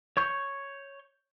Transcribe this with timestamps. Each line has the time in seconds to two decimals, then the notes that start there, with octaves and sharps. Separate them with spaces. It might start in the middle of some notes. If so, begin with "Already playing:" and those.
0.17 C#5 C#6 G6